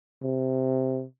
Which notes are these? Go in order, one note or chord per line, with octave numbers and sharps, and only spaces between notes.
C3